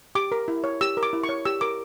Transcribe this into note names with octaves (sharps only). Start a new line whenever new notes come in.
G4 D6
A#4
E4
C#5
G4 E6
A#4
D6
E4
C#6
C#5
G4 E6
A#4 D6